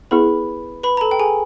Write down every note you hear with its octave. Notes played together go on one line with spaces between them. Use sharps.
B3 E4 G#4 B4 B5
B4 B5
A#5
A4 A5
G5
G#4 G#5